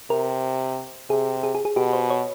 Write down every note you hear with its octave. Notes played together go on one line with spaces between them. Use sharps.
C3 A#4
C3 G#4
G#4
G#4
G#4
B2 G4
C5
C#5